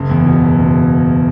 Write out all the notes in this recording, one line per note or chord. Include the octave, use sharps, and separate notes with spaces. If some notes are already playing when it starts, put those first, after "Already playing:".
Already playing: F#1
E2
B2
F#3
F#1